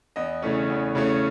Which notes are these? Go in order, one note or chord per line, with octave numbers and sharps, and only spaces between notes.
E2 D#5
C#3 E3 A3 C#4 C#5
E2
C#3 E3 A3 C#4